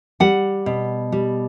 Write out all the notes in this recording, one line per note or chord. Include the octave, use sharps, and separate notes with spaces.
G3 F#5
B2
G3